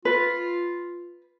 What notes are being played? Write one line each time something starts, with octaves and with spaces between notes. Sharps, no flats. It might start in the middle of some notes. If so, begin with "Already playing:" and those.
F4 B4